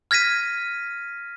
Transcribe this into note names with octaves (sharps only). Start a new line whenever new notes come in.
F6 G#6 A#6 B6 D#7